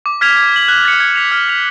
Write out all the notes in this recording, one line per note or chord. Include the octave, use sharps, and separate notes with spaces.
D6
F6 G#6 B6 F7
G#6
B6 F#7
F#6
A6 C#7
G#6
B6 F7
F6
B6 F7